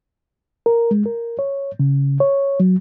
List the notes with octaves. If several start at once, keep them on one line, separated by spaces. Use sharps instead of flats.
A#4
G#3
A#4
C#5
C#3
C#5
F#3